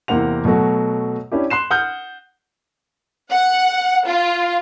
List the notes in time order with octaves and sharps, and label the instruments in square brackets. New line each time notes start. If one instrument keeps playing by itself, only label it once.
[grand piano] E2 C3 A#3 C4 F#5 F7
B2 F#3 A3 F#4
C#4 D4 E4 G4
C6 F#6 C7 E7
F#5 D#6 F6 G6
[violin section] F#5
F4